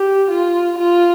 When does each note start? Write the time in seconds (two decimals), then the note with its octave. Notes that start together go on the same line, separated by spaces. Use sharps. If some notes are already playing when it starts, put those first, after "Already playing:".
Already playing: G4
0.31 F4
0.78 F4